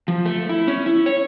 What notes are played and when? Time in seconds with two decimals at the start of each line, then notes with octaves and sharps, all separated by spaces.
0.08 F3
0.26 A3
0.49 E4
0.68 C#4
0.86 E4
1.06 C#5